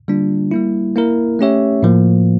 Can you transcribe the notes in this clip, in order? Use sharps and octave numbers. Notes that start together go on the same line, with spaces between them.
D3 G3 A#3 D4 F4
G3 A#3 E4
A#3 E4 A#4
A3 C#4 G4 C#5 E5
A2 F3 A#3